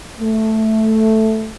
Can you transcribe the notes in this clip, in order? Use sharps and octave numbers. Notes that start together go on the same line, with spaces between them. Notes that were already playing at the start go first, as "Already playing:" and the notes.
A3